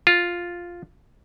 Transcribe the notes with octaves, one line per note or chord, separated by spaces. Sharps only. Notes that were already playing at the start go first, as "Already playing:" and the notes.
F4